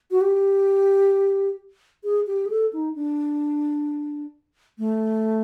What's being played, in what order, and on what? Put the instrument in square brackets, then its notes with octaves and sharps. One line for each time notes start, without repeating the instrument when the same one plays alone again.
[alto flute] F#4
G4
G#4
G4
G#4
A4
D#4
D4
A3